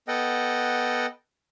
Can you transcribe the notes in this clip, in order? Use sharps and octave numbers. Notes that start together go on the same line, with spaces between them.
B3 A4 D#5 F#5 G5